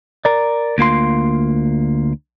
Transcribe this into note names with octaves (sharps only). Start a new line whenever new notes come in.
A#4 D5
D2 A#3 F4 C6